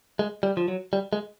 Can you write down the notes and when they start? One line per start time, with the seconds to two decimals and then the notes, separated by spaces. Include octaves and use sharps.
0.19 G#3
0.43 G3
0.57 F3
0.68 F#3
0.93 G3
1.13 G#3